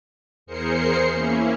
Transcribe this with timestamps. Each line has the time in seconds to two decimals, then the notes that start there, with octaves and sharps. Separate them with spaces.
0.46 E2 G#4 A#4 C5 C7 C#7
1.10 A#3 C#4 E4